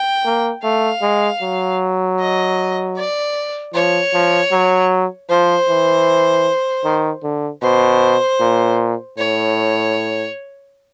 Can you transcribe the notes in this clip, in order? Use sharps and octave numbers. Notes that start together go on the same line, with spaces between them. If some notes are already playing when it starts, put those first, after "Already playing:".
Already playing: G5
A#3
A3 F5
G#3
F#3
D#5
D5
F3 C#5
F3
F#3
F3 C5
E3
D#3
D3
B2 C5
A#2
A2 C#5